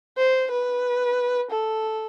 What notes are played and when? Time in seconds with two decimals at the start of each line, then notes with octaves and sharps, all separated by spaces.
0.17 C5
0.51 B4
1.50 A4